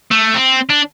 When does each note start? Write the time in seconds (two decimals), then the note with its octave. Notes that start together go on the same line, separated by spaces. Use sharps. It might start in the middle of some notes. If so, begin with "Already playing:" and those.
0.11 A3
0.34 C4
0.69 D4